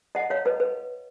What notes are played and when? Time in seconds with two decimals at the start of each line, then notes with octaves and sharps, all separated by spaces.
0.15 D#5 F#5
0.30 C#5 F5
0.45 B4 D#5
0.60 B4